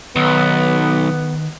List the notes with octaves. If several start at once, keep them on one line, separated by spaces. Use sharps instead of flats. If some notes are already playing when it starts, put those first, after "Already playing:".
B1 D#3 B3